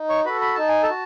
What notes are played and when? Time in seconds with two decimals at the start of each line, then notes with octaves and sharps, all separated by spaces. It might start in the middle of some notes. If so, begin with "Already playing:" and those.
Already playing: D#4
0.09 C#5 C#6
0.25 F#4 A4 B4 B5
0.41 B5
0.55 D#4 A5
0.68 G#5
0.83 A4 A5
0.90 F#4